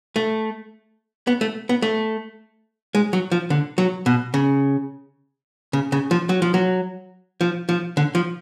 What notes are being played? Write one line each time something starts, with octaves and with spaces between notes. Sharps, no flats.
A3
B3
A3
B3
A3
G#3
F#3
F3
D3
F#3
B2
C#3
C#3
C#3
F3
F#3
F3
F#3
F3
F3
D3
F3